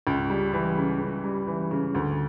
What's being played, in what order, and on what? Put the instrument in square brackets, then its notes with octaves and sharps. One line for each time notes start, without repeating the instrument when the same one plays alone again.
[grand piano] C#2
G3
E3
C#3
C#2
G3
E3
C#3
D2